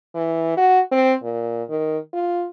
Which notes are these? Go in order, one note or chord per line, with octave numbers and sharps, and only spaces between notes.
E3
F#4
C4
A#2
D#3
F4